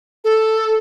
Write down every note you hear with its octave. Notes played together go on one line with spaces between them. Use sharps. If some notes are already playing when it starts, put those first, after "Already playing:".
A4